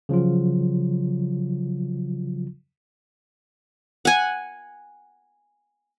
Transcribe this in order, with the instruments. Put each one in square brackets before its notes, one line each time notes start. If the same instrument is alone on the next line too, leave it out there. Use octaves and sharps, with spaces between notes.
[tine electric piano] C#3 F3 F#3 F4
[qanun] F#5 G#5